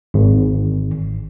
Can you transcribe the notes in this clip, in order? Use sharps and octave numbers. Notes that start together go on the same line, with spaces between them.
G#1